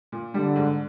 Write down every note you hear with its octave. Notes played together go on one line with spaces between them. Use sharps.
A#2
D3 G3
G#2